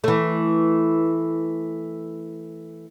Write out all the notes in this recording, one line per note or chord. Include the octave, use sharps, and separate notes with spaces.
E3 A3